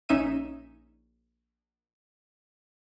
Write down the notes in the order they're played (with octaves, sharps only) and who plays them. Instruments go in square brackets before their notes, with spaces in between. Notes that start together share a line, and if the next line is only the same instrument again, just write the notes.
[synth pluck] A#1 C#4 D#4 E5 D#7